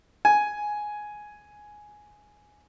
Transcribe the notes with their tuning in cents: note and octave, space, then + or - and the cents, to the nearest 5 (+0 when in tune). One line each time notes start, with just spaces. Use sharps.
G#5 +5